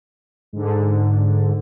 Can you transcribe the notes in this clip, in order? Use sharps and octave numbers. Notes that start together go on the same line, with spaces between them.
G#2 D3